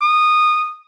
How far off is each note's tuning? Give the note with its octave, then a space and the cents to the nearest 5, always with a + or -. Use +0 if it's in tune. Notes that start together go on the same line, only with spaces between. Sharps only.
D#6 -20